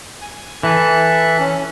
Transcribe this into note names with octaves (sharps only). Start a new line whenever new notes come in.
G#5
E3 A4 E5 F#6
C#4